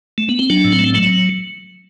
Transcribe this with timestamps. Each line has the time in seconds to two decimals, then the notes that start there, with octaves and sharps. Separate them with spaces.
0.18 A3
0.29 B3
0.39 C4
0.50 F#3 D4
0.64 A2
0.72 C4
0.79 A3
0.94 F#3 A3